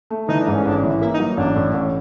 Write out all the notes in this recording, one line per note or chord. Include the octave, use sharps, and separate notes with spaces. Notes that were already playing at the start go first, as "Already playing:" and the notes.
A3
E3 D#4
D4
G#2
C#4
A1 D4
E3
A#3 E4
D#4
F#3
A1 D4
A2
A1